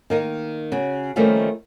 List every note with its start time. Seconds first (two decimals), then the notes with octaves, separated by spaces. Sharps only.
0.10 D#3 A#3 D#4
0.72 C#3 F#4
1.16 D#3 F3 G3 A3 A#3 C#4